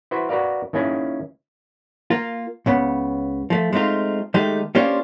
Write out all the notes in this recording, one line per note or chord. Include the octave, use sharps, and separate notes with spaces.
E4 F#4 B4 C5
F#4 A#4 B4 D5 F5
D#3 A#3 C#4 E4 G#4
A#3 F4
C#2 C#3 B3
F3 A3
G#3 A3 C4 D#4 F4
D#3 G#3 A3 D#4 G4
A#3 C#4 D4 F4 G4 C5